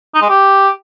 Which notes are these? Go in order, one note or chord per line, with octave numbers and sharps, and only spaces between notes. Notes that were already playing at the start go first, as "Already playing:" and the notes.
D#4
G#3
G4